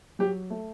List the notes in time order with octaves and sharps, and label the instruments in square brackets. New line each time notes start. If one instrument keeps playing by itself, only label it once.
[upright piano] F#3 G4
A3